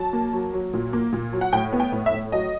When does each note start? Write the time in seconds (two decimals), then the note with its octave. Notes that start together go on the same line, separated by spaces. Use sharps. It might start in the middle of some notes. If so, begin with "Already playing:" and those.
Already playing: F#3 A5
0.13 A#3
0.33 F#3
0.53 F#3
0.73 A#2
0.93 A#3
1.12 A#2
1.33 F#3
1.41 F#5
1.53 A2 G5
1.73 B3
1.80 G5
1.92 A2
2.06 E5
2.13 A2
2.32 F#3 D#5